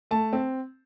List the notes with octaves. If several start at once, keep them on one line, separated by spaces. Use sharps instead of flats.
A3 A5
C4